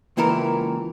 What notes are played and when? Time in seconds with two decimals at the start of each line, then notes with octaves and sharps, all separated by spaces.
0.17 C#2 A#2 E3 A4 A#4